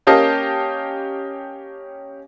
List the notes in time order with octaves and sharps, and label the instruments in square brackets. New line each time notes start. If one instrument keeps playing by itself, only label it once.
[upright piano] A#3 C#4 G4 D#5 F5 A5